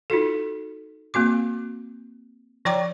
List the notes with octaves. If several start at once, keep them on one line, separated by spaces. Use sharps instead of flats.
D#4 F4 F#4 A4
A#3 C4 F#4 D6
F3 C#5 D5 G5 A#5 D6